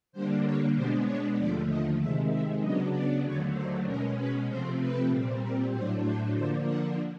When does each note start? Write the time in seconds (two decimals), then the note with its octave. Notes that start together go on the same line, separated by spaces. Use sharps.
0.12 D3 G3 A#3 D4 C5
0.44 C#5
0.74 B2 G#3 B3 D4 C5
1.05 C#5
1.37 D#2 D3 F3 A3 D5
1.68 D#5
1.99 C3 D#3 G#3 E5
2.30 E5
2.61 C#3 F#3 B3 D4 D#5
2.93 D5
3.23 D#2 D3 F#3 A3 C#5
3.54 C5
3.86 B2 G#3 C#4 A#4
4.18 B4
4.48 C3 F3 A3 C4 C5
4.80 B4
5.10 A#2 G3 C4
5.41 A#4
5.72 A2 F#3 A3 D4 C5
6.04 C5
6.34 D3 F3 A#3 D4 C5
6.66 F#5